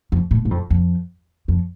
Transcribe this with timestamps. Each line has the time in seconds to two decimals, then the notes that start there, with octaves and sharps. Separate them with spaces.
0.12 F2
0.31 A2
0.45 G#2
0.51 F2
0.70 F2
1.48 F2